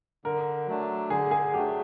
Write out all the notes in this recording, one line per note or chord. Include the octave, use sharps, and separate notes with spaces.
D3 A#4
F#3 A3 D4
D3 G#4
G#4
F#3 A3 D4 G4